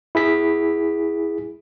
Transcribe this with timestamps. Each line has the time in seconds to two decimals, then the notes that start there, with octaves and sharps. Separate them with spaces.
0.15 E4 G#4 B6